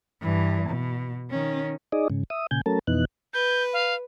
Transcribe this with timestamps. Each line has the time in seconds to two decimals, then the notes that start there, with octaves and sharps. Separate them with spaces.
0.21 G2 E3
0.69 B2
1.30 D#3 C#4
1.92 D#4 G#4 D5 D#5
2.10 G#2 C#3
2.30 E5 D#6
2.51 A#2 C#3 G#5 G6
2.66 F#3 A3 C#4 A4 A#4 A5
2.87 F2 B2 E3 B3 D#4 F#6
3.34 B4 G6
3.73 F5